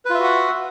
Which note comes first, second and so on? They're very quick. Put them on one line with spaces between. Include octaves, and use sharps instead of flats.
B4 F4 E5 F#4 F#5